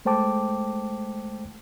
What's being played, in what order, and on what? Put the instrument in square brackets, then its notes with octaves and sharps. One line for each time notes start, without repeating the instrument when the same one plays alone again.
[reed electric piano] G#3 A3 C5 G5 A5 D6